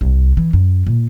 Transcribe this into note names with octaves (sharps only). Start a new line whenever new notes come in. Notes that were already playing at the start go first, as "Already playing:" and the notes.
C2
E3
F#2
A#2